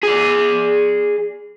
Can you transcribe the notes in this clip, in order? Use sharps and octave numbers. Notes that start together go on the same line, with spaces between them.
G#4 D5